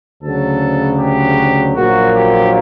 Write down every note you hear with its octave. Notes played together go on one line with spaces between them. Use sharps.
D2 C#3 F#3 A4
G4
A#1 A#2 F#3 A#3 F#4
G4